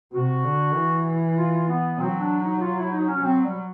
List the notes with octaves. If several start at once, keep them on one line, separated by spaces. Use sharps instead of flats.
C3 F#4
D3
E3
F4
B3
F#3 C4
D4
D#4
F4
E4
D#4
C#4
F#3 C4
G3